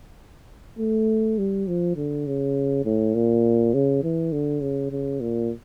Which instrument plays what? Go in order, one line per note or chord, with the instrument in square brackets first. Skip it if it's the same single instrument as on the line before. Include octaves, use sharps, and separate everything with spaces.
[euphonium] A3
G3
F3
D3
C#3
A2
A#2
C#3
E3
D3
C#3
C#3
A#2